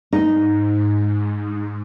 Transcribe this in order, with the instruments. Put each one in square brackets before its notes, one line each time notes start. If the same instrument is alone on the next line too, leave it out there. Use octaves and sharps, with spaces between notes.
[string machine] G#2 [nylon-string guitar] D#4